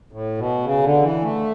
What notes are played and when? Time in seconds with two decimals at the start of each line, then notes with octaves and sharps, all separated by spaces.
0.12 A2
0.38 B2
0.64 C#3
0.84 D3
1.03 E3
1.22 A3